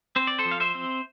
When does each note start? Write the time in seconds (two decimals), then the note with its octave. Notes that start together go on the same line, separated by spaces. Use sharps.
0.16 C4 C5
0.27 D5
0.39 A4 C5
0.45 F3
0.51 F5
0.60 C5 E5
0.75 C4